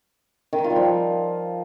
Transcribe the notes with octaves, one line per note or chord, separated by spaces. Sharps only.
D#3
D#4
F4
G3
F3